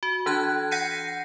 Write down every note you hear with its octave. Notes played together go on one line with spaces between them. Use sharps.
F#4
E3 D4 A5 F#6 G#6
F#5 G6 A#6 C7 C#7 D#7